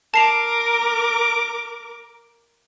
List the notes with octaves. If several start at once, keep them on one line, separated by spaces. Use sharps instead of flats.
A#4 A5 D6 C7 F7